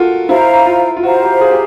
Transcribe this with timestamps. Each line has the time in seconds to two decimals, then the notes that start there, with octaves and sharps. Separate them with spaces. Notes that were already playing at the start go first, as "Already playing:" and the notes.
Already playing: F4 F#4 A4 A#4
0.29 E4 C5 F5 A#5
0.66 F4
0.97 F4
1.03 F#4 C5 F5 A#5
1.23 G4
1.41 G#4
1.51 G4